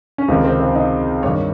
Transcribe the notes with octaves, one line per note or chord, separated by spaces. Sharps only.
C#4
C#2 C3 D#3 C4
C4
C4
D#4
G2 D#3 C#5